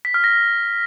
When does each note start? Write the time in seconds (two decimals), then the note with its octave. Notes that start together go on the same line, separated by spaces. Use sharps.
0.05 B6
0.14 F6
0.24 A#6